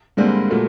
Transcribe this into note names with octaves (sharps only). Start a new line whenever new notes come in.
G2 D3 G3 G#3 A#3 C4
A#2 F#3 A3